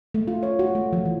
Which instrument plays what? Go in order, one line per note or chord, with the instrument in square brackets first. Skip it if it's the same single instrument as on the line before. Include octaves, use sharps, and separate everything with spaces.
[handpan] A3
F4
C#5
F#4
A3
F3
E3